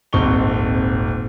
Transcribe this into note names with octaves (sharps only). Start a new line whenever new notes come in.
D#1 G#1 C4 C#6 G7